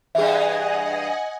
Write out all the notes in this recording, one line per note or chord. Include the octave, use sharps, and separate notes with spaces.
G2 E3 G#4 D#5 E5 F#5 G#5